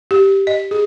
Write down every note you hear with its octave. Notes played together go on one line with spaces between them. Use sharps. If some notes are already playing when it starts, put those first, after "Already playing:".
G4
D#5
G#4